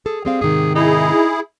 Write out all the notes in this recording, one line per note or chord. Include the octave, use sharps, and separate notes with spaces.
G#4 A4
G3 C4 G#4 F5
G#2 C3 D#3 G#4
D#4 E4 G#4